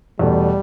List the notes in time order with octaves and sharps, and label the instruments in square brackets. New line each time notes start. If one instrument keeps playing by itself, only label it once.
[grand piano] E2 B2 A3 [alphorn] G3